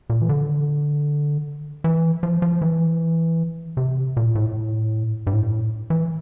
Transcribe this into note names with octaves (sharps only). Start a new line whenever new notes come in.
A#2
E3
D3
E3
F3
F3
E3
C3
A#2
A2
G2
A2
E3